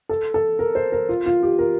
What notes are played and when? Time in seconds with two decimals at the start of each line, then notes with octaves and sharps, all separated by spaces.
0.09 A4
0.34 A4
0.59 A#4
0.75 C5
0.92 A#4
1.09 F4
1.26 F4
1.43 G4
1.59 A#4